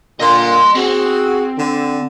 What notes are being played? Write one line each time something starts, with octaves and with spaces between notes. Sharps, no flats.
A#2 D3 D#5 C6
C4 F#4 G#4
D3